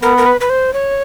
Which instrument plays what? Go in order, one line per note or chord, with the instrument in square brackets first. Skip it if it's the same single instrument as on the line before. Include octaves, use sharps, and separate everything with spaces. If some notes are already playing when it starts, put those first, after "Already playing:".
[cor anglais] B3 [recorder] A#4
[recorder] A#4
B4
B4
C5
C#5